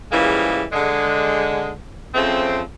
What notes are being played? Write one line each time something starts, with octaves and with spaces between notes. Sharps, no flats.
C#3 E3 F3 G3 G#3 A#3
D3 G#3
C#3 F3 A3 C4